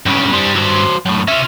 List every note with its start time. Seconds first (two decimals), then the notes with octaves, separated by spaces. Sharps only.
0.06 B1 G2 C#3 G4
0.33 G3 C5
0.56 F#3 C5
1.05 F#2 A2
1.28 C3 C#4 F4 E5